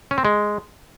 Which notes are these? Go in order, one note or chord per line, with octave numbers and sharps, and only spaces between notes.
C#4
C4
G#3